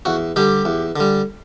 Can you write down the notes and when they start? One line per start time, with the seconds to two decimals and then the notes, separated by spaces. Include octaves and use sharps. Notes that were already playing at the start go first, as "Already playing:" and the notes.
0.05 E2 F#4
0.36 D3 G3 G4
0.65 E2
0.96 D3 G3